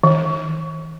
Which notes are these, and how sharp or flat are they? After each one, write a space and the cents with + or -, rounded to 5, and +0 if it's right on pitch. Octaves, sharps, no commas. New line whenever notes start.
D#3 +45